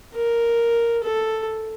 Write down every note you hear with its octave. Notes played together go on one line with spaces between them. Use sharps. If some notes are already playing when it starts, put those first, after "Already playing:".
A#4
A4